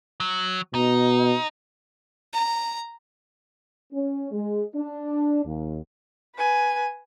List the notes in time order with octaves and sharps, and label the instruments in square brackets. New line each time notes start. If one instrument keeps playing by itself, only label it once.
[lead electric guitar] F#3
[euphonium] B2 [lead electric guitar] D#4
[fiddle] A#5
[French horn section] C#4
G#3
D4
D#2
[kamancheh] B4 G#5